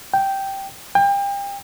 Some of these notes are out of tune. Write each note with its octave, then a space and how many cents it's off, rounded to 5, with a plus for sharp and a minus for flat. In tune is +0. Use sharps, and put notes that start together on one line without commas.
G5 -5
G5 +35